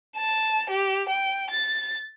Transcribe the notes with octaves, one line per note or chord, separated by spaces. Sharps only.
A5
G4
G5
A6